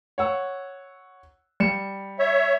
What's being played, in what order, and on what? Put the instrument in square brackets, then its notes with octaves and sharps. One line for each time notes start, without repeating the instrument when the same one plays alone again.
[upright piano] C#5 F#5 E6
G3 C#7 E7
[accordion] C#5 E5